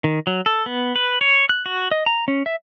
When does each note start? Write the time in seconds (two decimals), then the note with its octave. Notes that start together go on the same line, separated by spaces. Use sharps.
0.04 D#3
0.27 F#3
0.46 A4
0.66 B3
0.96 B4
1.21 C#5
1.49 F#6
1.66 F#4
1.91 D#5
2.06 A#5
2.28 C#4
2.46 E5